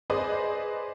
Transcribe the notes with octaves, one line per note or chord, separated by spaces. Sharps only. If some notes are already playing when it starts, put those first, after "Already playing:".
G#4 B4 C5 D5 D#5